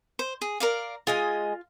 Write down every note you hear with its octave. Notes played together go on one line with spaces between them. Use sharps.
C5
G#4
A#4 D5 F5
G#3 F4 D#5 G#5